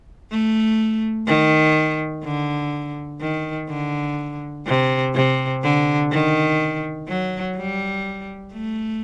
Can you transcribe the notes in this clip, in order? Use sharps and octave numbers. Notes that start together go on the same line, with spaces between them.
A3
D#3
D3
D#3
D3
C3
C3
D3
D#3
F#3
G3
A3